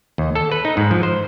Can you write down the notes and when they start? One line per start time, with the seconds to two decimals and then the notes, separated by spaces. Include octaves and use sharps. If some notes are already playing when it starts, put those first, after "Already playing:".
0.18 D#2
0.35 A4
0.52 B4
0.65 D#4
0.77 G#2
0.91 F3
1.03 C5